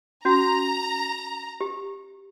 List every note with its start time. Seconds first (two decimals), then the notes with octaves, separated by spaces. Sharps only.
0.25 C#4 F#4 A#5
1.61 G4